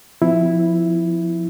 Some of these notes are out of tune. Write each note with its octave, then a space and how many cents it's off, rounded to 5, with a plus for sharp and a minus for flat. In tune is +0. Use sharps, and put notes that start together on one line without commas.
F3 -5 C4 -45 E4 +0